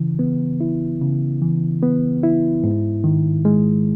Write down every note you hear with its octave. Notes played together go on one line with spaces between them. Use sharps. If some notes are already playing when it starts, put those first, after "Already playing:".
Already playing: C#3 E3
B3
E4
C#3
E3
B3
E4
G#2
D#3
G#3